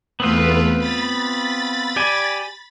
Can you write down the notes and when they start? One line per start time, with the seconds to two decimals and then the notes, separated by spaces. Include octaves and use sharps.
0.20 E2 A3 B3 C4 F4 B4
0.78 B5 A6
1.96 G4 D5 G#5